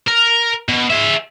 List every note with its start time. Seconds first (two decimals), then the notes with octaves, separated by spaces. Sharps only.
0.08 A#4
0.69 B2
0.90 G#4 E5